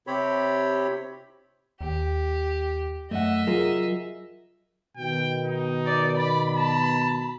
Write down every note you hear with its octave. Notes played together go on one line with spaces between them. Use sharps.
C3 C4 G4 C#5 B5
D#2 G4
F#2 A3 D#5 E5 F#5
F#3 F4 G#4 A#4
B2 D#3 G5
D#4
D5
D5 B5
A5